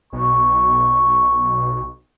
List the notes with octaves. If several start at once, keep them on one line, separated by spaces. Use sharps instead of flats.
B1 C#6